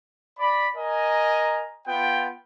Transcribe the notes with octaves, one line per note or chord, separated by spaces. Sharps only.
D5 B5
A#4 D#5 G#5 A#5
B3 F4 G5